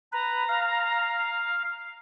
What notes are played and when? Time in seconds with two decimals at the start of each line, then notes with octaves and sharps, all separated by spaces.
0.12 B4 A#5
0.49 F5